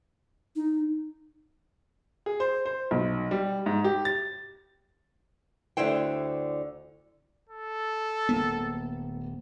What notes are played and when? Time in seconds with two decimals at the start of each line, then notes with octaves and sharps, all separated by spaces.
0.56 D#4
2.26 G#4
2.40 C5
2.66 C5
2.91 B1
3.31 G3
3.66 G#2
3.84 G4
4.05 A6
5.77 D2 D3 E4 C5 G5
7.49 A4
8.29 D1 A#3 B3